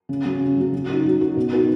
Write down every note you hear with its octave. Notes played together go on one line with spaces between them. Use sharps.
C#3
F#3 C#4
C#3
F#3 C#4
F#3
D#4 F#4
F#3
D#4 F#4
B2
B3 D#4 F#4